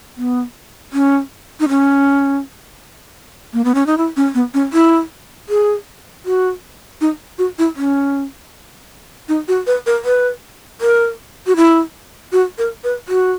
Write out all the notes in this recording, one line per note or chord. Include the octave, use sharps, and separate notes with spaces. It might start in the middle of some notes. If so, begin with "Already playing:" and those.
B3
C#4
D#4
C#4
A#3
B3
C#4
D#4
E4
C#4
B3
C#4
E4
G#4
F#4
D#4
F#4
E4
C#4
D#4
F#4
B4
A#4
B4
A#4
F#4
E4
F#4
A#4
B4
F#4